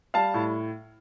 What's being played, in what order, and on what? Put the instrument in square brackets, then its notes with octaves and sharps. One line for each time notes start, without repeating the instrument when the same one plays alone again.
[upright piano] G3 F5 A5
A2